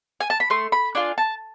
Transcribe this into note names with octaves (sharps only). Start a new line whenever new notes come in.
G#5
A5
B5
A3 C6
B5
D4 F4 G#5
A5